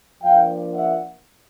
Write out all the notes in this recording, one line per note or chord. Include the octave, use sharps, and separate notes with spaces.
F3 A#3 D4 F5 G5
E5 F#5